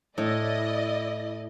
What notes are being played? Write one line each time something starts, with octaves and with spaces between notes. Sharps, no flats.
A2 E4 D5 D#5